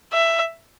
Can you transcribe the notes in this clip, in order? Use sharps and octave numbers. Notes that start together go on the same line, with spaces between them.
E5